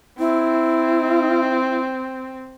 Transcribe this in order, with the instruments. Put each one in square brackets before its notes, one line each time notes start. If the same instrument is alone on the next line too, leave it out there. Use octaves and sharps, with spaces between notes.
[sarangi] C4 [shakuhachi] E4